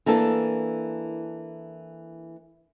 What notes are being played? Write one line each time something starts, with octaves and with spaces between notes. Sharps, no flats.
E3 A#3 D4 A4